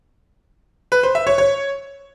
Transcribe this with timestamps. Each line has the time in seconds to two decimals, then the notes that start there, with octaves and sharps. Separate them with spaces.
0.92 B4
1.03 C5
1.15 E5
1.27 C#5
1.38 C#5